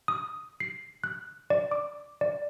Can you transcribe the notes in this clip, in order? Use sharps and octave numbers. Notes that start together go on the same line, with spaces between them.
D#6
C7
F#6
D5
D6
D5